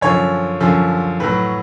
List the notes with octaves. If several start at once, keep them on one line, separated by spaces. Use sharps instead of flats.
F#2 D3 F3 C#5
F#2 D3 F3
A2 F#3 B4